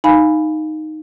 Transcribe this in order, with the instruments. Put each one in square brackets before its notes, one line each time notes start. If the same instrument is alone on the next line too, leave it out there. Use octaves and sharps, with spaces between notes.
[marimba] D#4 F5 G#5 B5